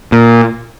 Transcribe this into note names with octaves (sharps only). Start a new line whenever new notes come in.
A#2